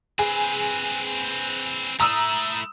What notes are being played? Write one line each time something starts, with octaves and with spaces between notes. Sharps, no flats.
C4 G#4 B4
A3 E4 A#5 D#6 E6